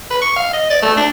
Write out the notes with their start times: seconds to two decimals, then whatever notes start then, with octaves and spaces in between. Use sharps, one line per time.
0.11 B4
0.22 C#6
0.36 F5
0.53 D#5
0.70 D5
0.82 A3
0.97 D4